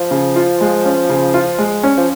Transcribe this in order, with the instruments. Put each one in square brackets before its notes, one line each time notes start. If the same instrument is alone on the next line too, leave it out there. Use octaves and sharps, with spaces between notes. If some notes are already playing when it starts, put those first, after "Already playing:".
Already playing: [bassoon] F3
[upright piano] C#3
F4
G#3
C#4
C#3
F4
G#3
C#4
[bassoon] F3